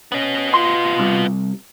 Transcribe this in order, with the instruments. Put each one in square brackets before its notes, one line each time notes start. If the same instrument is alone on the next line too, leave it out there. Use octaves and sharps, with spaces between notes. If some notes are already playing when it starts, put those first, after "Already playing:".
[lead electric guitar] B3 D#5 [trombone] C#4
[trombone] F4 [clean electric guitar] C6
[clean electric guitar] C2